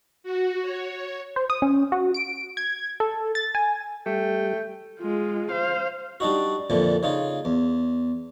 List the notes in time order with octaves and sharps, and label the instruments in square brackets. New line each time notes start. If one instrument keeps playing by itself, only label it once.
[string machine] F#4
C#5
[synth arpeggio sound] C5
D#6
C#4
F#4
D7
G#6
A4
A6
G#5
[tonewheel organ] G3 [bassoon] A3 [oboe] G5
[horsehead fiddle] G#3 F4
C5 F5
[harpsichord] G3 D4 D#4 F#4
F2 A#2 D3 E3
C#3 D#4 F4
E2